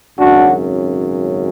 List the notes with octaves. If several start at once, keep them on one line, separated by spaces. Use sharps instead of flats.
G#1 F#2 C#3 D4 F#4